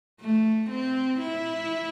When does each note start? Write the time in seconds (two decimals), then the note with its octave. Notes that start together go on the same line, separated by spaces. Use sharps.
0.21 A3
0.70 C4
1.19 E4